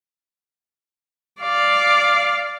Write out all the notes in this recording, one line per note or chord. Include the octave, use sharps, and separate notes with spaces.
D5 F5